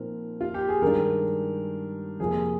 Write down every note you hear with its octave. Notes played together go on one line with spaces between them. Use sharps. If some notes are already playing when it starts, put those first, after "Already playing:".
Already playing: A#2 F3 C4 D#4 A#4
F4
G4
G#4
G2 D#3 G#3 D4 A#4
F2 C3 F3 A#3 G#4